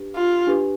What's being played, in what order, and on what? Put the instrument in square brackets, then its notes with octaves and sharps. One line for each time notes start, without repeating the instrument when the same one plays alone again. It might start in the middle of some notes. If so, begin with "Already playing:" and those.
Already playing: [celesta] D4 G4 B4
[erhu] F4
[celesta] D4 G4 B4